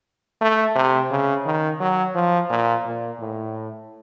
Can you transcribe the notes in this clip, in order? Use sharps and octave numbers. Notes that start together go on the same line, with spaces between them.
A3
C3
C#3
D#3
F#3
F3
A#2
A#2
A2